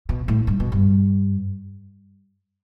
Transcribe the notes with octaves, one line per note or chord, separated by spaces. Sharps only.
B2
A2
G2
B2
G2